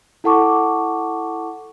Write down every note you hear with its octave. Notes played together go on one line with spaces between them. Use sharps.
E4 A4 F#5 A5 C#6 D6